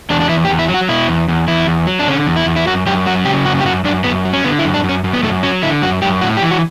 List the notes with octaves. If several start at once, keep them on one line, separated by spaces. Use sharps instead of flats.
E2 D4
D4
E2 E4
G4
E2
E4
F#3
F#4
B2 E4
E2
E2
E2 E4
E2
F#3
D4
D3 C#4
E2
E4
E2
E4
F#2 F#4
F#2 G4
F#3 F#4
C#3 G4
F#2 F#4
G4
F#2 F#4
F#2 D4
F#2 B3
F#3
C#4
D3 B3
E4
F#2
D4
F#2
C#4
F#2
B3
F#2 A3
F#3 C#4
D3 E4
F#2 F#4
F#2 G4
A2 F#4
G4
E3
F#4